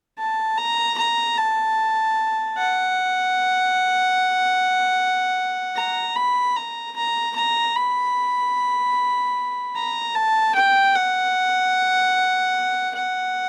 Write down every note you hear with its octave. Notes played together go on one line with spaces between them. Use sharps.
A5
A#5
A#5
A5
F#5
A#5
B5
A#5
A#5
A#5
B5
A#5
A5
G5
F#5
F#5